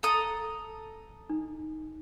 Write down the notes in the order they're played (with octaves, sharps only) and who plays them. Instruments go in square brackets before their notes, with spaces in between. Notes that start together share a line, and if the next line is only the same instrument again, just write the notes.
[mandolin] A4 A#5 D#6
[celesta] D#4